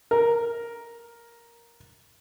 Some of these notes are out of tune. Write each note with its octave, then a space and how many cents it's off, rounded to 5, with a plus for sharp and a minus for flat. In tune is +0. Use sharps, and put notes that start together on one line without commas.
A#4 +5